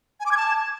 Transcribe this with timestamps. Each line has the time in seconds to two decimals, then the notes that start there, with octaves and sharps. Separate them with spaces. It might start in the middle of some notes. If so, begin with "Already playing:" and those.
0.20 G#5
0.26 D6
0.31 G#6
0.37 A5